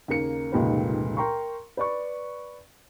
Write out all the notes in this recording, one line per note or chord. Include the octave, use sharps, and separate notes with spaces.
D#2 C#3 A#3 C#7
F1 C#2 A#2 D#3 G4 B4
A#4 G5 A#5 C6 C#6
B4 D5 C#6